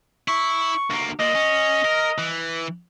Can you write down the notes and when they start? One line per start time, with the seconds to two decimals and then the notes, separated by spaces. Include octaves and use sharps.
0.28 E4 C#6
0.90 D2 A#3
1.20 A#2 D#5
1.35 C#4
1.85 A#4
2.18 E3